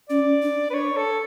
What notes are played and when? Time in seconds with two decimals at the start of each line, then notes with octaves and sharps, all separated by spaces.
0.09 C#4 D5
0.42 D4
0.70 B4
0.74 C#5
0.96 A4